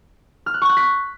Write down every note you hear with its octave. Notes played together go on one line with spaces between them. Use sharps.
F6
F#6
C#6
F#6
B6